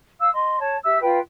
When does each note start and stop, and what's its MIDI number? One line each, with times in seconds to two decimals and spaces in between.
0.20 0.32 77
0.20 0.32 88
0.33 0.59 75
0.33 0.59 84
0.59 0.76 73
0.59 0.76 81
0.84 1.00 67
0.84 1.00 76
0.84 1.00 88
1.01 1.18 65
1.01 1.18 71
1.01 1.18 79